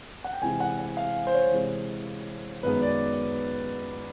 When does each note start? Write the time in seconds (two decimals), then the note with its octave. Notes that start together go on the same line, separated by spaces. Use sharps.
0.24 F#5
0.33 G5
0.42 C3 E3 G#3 C4 G#5
0.60 F#5
0.79 F#5
0.97 F5
1.27 C5
1.34 C#5
1.52 C3 E3 G#3
2.63 F#2 D#3 G#3 B3 B4
2.82 D5